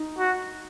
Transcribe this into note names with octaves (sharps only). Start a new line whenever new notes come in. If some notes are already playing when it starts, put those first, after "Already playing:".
Already playing: D#4
F#4